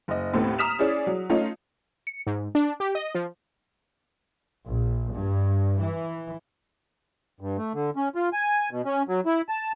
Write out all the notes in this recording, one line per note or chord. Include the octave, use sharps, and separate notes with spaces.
F#1 D#5
D#2 A2 A3 B3 C4
A#5 D#6 F6 B6 E7 F7
C#4 E4 G#4 D5
F#3
A3 C#4 D#4 F4
C#7
G#2
D4
G4
D#5
F3
A#1
G2
E3
G2
A3
D3
C#4
F4
G#5
B2
C#4
F#3
E4
A5